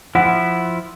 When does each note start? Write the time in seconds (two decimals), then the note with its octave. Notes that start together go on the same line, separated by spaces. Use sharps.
0.15 F3 E4 F#5